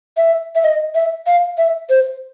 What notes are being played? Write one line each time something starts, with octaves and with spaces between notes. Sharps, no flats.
E5
E5
D#5
E5
F5
E5
C5